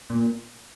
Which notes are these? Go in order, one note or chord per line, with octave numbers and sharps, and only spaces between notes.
A#2